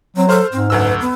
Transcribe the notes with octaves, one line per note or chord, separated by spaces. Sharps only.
F#3 C4
A4 C5 F6
G#2 C4
F#1 D2 B4 E6
B3